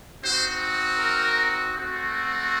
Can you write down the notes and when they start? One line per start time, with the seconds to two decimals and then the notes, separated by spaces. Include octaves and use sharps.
0.22 C4 D#4 F#4 C5
0.99 A#4
1.76 A3 C4 F#4